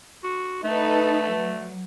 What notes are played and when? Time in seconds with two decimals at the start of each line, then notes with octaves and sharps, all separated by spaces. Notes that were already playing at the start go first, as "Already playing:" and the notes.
0.24 F#4
0.63 A3 D#4 A4 B4
1.30 F#3